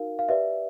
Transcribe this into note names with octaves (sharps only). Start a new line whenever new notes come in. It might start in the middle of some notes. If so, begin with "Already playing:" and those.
Already playing: D#4 F#4 A#4 F5
F5
G4 B4 D5 E5